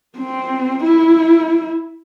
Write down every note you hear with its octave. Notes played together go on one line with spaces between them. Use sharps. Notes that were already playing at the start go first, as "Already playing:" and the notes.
C4
E4